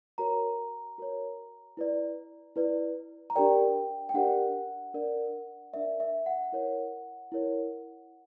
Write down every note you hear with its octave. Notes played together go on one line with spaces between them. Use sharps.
F#4 A#4 C#5 A#5
F#4 A#4 C#5
E4 B4 D5
E4 B4 D5
A#5
D4 G4 A#4 D5 G5
G5
D4 G4 A#4 D5 F#5
D4 A#4 D5
D4 A#4 D5 E5
E5
F#5
E4 A#4 C#5
E4 A#4 C#5